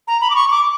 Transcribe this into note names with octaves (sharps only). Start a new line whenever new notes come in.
A#5
B5
D6
C#6
D6